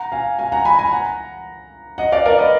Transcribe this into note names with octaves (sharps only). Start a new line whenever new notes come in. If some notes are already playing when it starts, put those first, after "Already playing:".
Already playing: F#5 A#5
F5 G#5
F5 G#5
F#5 A#5
G#5 B5
G#5 B5
F#5 A#5
D#5 F#5
D5 F5
A#4 D5
B4 D#5